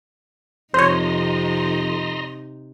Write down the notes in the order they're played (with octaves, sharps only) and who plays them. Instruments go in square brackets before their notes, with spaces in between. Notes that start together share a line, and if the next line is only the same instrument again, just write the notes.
[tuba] F2 [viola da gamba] C3 D#4 [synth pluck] C5 C#5 [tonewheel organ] D#5 A#5 C6